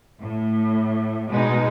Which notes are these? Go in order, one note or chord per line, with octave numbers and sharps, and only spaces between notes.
A2
B2 G#3 D#4